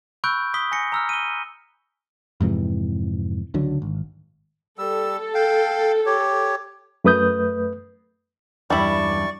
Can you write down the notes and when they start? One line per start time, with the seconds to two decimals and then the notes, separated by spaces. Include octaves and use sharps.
0.24 B5 C#6 E6 F#6 G6 D7
0.54 D#6 B6 G7
0.72 G#5 A#6 C#7
0.92 A#5 E6 F6
1.09 D#7 G7
2.41 F2 G#2 C3 E3
3.54 C#2 D3 F#3
3.82 G#1
4.78 G3 A4 E6
5.35 F5 G5
6.06 G4 C#5
7.04 F#2 A3 B4 D#6 G6
8.70 E2 G2 G3 E4 D5 C#6